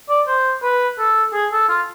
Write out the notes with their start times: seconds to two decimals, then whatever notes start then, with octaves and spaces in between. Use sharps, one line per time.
0.09 D5
0.27 C5
0.63 B4
0.99 A4
1.33 G#4
1.52 A4
1.69 F4